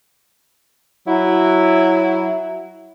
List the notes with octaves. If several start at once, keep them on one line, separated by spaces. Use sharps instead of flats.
F#3 E4